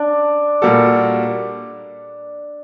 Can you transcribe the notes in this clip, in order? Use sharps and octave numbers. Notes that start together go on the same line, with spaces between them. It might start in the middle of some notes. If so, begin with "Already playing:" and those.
Already playing: D4 D5
A#2 G3 A#3 F#4 A4